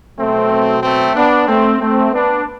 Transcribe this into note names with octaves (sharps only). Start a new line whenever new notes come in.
B2 F#3 A3 C4
A3 C4
B3 D4
A3 C4
A3 C4
B3 D4